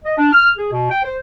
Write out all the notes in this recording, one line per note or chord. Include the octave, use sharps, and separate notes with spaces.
D#5
D4
F6
G#4
B2
G5
C5